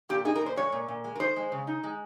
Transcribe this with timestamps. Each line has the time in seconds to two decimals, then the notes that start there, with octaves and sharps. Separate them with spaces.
0.09 A#2 G4
0.25 D#4 G#4
0.35 A#4
0.41 A#2
0.46 C5
0.56 G#3 C#5
0.72 A#2
0.88 A#2
1.04 G#3
1.15 A#4
1.20 D#4 C5
1.36 G#3
1.52 C#3
1.67 D#4
1.84 G#3